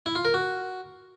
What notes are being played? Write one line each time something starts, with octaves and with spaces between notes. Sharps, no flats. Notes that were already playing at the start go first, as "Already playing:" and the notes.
E4
F4
A#4
F#4